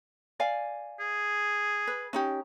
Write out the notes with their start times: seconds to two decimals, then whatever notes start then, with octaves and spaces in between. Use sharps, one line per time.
0.40 D5 F5 G#5
1.00 G#4
1.87 B4
2.13 C#4 D#4 G4